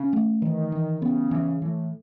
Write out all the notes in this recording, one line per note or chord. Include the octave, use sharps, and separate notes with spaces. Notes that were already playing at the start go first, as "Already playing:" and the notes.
Already playing: C#3 C#4
A3
D#3 E3
E3
C#3 B3
E3
A2 E3